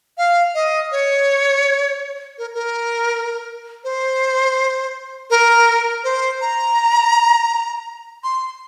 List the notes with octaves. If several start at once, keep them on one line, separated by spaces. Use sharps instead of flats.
F5
D#5
C#5
A#4
A#4
C5
A#4
C5
A#5
C6